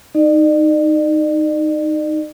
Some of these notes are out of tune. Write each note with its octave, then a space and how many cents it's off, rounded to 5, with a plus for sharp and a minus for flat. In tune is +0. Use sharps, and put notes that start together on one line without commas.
D#4 -5 D5 +40